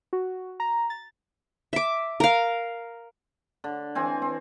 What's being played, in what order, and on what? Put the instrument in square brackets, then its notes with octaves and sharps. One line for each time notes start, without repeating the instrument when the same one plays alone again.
[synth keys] F#4
A#5
A6
[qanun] E5 D6
A#4 F5
[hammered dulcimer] D3
E3 C4 G#5
C4